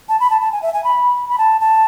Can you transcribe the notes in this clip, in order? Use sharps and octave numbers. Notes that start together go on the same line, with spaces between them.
A5
B5
A5
A5
G#5
E5
G#5
B5
B5
A5
A5